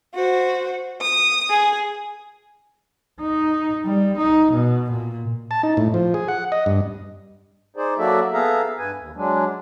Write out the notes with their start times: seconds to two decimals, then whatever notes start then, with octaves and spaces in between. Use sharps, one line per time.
0.15 F#4 C5
1.02 D#6
1.50 G#4
3.21 D#4
3.86 G3
4.18 D#4
4.52 B2
4.91 A#2
5.51 A5
5.63 D#4
5.77 A2
5.94 F3
6.14 G#4
6.28 F#5
6.52 D#5
6.66 G2
7.77 D#4 G#4 C5 D5
7.98 F#3 A#3 F#4 A4 D5 E5
8.33 B3 G#4 A4 E5 F5 A#5
8.79 G2 B4 G#5
8.97 D#2
9.16 F#3 G#3 D4